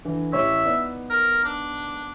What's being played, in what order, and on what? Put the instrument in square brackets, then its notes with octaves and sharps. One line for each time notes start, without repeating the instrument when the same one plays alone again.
[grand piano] D3 E3
[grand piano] A1 G4 C#5 [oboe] E5
[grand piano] B3 D#4 D5
[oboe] A#4
D4